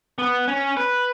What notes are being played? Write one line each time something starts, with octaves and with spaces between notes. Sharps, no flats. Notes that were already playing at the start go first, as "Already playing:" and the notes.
B3
C#4
B4